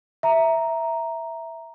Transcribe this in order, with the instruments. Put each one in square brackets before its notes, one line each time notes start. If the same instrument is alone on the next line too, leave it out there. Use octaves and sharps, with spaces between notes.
[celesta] E5 A#5